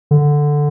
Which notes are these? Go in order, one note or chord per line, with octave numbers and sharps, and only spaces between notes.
D3